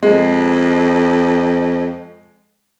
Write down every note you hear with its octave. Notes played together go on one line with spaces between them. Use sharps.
F2 G#3